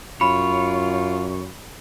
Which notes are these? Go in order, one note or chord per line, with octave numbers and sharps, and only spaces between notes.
F#2 F4 C#5 B5